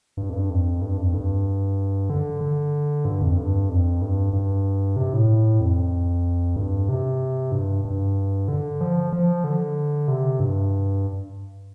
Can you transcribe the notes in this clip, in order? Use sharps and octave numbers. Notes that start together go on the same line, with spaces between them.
G2
F2
G2
F2
G2
F2
G2
D3
D3
G2
F2
G2
F2
G2
G2
C3
A2
F2
G2
C3
G2
G2
D3
F3
F3
D3
C3
G2